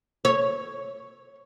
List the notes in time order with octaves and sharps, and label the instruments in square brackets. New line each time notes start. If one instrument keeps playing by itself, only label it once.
[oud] C#5